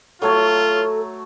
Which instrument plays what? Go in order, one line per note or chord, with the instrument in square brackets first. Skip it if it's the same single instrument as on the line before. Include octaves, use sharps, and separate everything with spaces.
[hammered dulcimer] F#3 A3 C#5 [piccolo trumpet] F4 [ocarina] A4